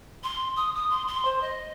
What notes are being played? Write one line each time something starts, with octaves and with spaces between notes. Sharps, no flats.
C6
D#6
D#6
C6
C6
C5
D#5